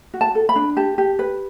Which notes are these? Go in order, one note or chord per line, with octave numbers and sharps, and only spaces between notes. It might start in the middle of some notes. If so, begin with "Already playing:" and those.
F#4
A5
A4
B5
D4
G4 A5
G4
B4